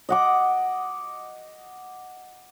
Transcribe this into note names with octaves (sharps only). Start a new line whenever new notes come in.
D#5 F#5 D6